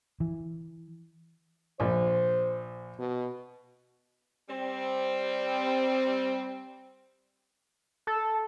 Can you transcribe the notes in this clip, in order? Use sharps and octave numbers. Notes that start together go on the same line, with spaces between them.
E3
A#1 C5
B2
G3 C4
A4